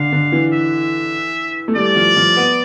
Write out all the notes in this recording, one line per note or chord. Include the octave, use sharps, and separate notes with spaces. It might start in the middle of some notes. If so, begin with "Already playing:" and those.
Already playing: D3 F5
D3
E3
E5
A3
G3 D5
F3
F3
B3